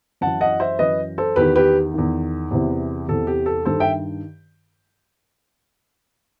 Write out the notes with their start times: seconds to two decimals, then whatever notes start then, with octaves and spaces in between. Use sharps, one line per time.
0.21 F#2 E3 F#5 A5
0.41 D#5 F#5
0.60 C5 E5
0.79 F#2 E3 B4 D#5
1.18 A4 C5
1.36 E2 D#3 G4 B4
1.56 G4 B4
1.94 E2 D#3
2.51 E2 C3 E3
3.08 E2 C3 E3 A4
3.27 G4
3.46 A4
3.65 G2 D#3 A4 C5
3.80 E5 G5